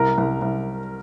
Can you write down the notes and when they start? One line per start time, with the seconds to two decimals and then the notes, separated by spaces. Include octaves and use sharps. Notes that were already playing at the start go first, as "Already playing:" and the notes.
Already playing: C2 A#4 A#5
0.18 C2
0.42 C2